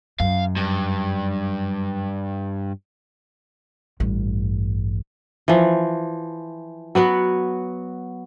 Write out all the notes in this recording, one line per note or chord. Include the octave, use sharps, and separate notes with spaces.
F#2 F5
G2
A1 G2
E3 F3
F#3 B3 F#4 B4